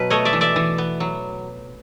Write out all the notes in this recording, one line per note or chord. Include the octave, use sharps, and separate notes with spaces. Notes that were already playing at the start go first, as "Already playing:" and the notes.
Already playing: B2 F#3 B4
A3 C#5 D#5
D5 E5
E3
D5 E5
E3
B3
F#3